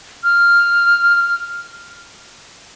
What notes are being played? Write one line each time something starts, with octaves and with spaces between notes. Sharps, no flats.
F6